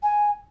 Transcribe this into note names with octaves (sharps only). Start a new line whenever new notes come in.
G#5